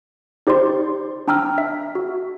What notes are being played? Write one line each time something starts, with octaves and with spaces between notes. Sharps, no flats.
D#4 G4 C5 D5 C6
D4 G5 A#5 E6 F6
E5
F#4